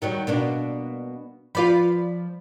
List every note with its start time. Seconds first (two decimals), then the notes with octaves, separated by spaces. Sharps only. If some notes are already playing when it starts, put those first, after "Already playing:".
0.02 D#3 F#3 G3
0.27 B2 A#3 D4
1.55 F3 F4 B4 D5 B5